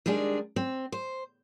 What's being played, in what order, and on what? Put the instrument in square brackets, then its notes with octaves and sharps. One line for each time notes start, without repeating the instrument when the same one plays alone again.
[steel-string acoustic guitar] D#3 G3 G#3 D4 G#4
C4
C5